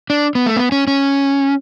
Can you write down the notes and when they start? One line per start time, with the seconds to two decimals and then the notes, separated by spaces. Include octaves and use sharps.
0.10 D4
0.35 B3
0.46 A3
0.57 B3
0.72 C#4
0.87 C#4